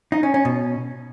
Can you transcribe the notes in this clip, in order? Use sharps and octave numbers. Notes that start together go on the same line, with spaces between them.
D#4
C#4
C#4
B2